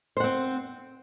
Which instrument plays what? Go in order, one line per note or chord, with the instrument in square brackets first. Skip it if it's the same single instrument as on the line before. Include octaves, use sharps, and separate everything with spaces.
[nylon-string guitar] C5
F#5
C4